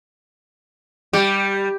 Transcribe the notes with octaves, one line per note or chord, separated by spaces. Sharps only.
G3 G4